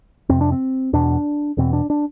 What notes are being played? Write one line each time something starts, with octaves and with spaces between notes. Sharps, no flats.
F2 C3 C4
D4
C4
E2 B2 D4
E2 B2 C4
D4
D4